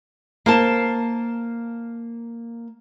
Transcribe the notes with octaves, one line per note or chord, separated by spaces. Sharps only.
A#3 C5 A5